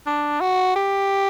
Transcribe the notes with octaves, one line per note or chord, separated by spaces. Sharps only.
D4
F#4
G4